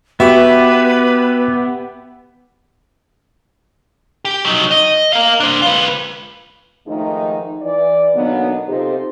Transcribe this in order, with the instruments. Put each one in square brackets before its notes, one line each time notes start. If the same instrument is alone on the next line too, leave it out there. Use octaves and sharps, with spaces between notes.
[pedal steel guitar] B3 [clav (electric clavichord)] F#4 [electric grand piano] G4 E5 [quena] B4
[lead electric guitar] G4
F#3 D#4
D#5
A#4 F5
D4 C5
F4 B4
[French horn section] G#2 D#3 F3 A3 D#4
E3 D5
B2 D3 F#3 A#3 B3 D#4
C3 D#4 F4 G4 A4 C5